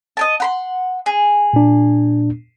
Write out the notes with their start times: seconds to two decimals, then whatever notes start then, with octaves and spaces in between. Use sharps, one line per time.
0.17 D#5 G#5 A5
0.40 F#5 B5 C6
1.06 G#4
1.53 A#2 D4